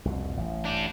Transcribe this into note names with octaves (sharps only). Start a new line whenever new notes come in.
C2 F2 B2
A1
D4 G4